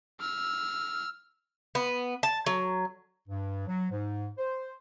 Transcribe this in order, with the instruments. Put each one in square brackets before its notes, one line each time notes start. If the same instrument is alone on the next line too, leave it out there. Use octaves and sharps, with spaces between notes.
[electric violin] E6 F6
[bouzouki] B3
A5
F#3
[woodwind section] G2
F#3
G#2
C5